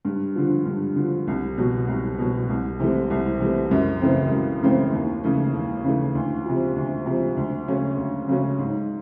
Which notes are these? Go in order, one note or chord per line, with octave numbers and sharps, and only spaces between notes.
G2
D3 F3
G2
D3 F3
C2
B2 F#3
C2
B2 F#3
C2
C3 E3 A3
C2
C3 E3 A3
F#2
C#3 E3 A3 C4
F#2
C#3 E3 A3 C4
D#2
C#3 E3 A3
D#2
C#3 E3 A3
D2
C3 F3
D2
C3 F3
D2
C#3 F#3 A3 C#4
D2
C#3 F#3 A3 C#4
G#2